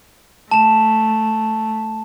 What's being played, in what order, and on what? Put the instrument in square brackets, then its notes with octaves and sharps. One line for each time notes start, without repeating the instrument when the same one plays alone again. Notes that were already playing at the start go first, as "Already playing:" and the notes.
[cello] A3 [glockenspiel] A5 E7